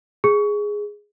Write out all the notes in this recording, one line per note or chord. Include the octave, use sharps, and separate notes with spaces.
G#4